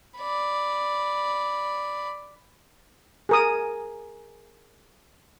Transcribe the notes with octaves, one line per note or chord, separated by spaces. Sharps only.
D5 B5
G#4 A#4 D#6